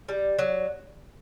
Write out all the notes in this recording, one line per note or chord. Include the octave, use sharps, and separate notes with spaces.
G3 D5
F#3